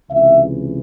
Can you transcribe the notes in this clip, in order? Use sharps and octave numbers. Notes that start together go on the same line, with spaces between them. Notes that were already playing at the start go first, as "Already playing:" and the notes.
C#2 C3 E3 E5